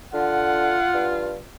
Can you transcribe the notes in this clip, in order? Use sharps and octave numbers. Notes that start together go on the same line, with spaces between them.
D3 F4 F#5
G2